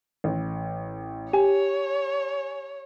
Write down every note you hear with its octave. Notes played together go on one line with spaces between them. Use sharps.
A1
G4 C#5 G#5